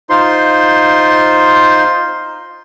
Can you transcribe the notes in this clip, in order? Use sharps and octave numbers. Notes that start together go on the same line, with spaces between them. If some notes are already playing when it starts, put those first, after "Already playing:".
D#4 F4 C5 C6